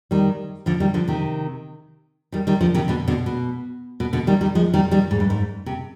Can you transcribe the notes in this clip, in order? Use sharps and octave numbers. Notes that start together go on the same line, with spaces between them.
D#3 G3
D3 F3
D#3 G3
D3 F3
C3 D#3
D#3 G3
D#3 G3
D3 F3
C3 D#3
B2 D3
B2 D3
B2
B2
B2 D3
D#3 G3
D#3 G3
F3 G#3
D#3 G3
D#3 G3
G#2
G2
G#2
C3